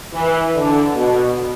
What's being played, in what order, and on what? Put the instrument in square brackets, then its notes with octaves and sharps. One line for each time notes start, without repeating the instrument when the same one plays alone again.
[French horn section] E3
D3
B2